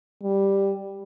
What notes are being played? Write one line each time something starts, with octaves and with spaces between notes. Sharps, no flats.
G3